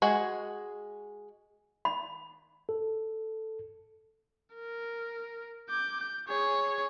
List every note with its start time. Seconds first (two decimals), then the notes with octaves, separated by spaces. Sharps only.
0.02 G#3 F#4 G#4
1.85 B5
2.69 A4
4.55 A#4
5.70 D6 G6
6.00 G6
6.29 G#4 C#5